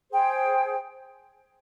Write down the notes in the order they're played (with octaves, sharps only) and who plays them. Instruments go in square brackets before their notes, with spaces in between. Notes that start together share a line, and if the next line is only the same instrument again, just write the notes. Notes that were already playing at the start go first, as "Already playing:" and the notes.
[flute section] G#4 C5 G5